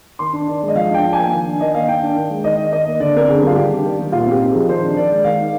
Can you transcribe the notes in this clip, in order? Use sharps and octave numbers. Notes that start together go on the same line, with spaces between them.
D#3 C6
D4
D#3 D5
G#3
D#5
F3 F5
D4 G5
F3
G#5
A#3
D#3
D4
D#3 D#5
A#3 F5
D#3 G5
D4
D#3
G#3
D#3 D#5
D#4
D#3 D#5
A#3
D3 D5
C4 A#4
D3 G#4
G3
F4
D#3 G4
D4
D#3
G3
A#2 F4
C4 G4
D#4
F3 G#4
D#3 C5
D4
D#3 D5
G#3
D#3 F5
D#4